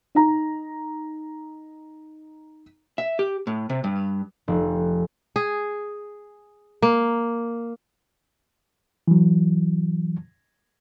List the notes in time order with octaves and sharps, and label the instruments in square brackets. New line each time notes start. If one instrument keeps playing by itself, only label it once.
[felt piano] D#4 A#5
[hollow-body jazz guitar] E5
G4
A2
C3
G2
[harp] F1
[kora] G#4
A#3
[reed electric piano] E3 F#3